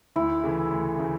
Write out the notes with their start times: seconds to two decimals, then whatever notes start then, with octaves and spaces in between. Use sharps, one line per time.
0.16 D2 E4
0.43 C#3 E3 A3
0.71 D2
0.99 C#3 E3 A3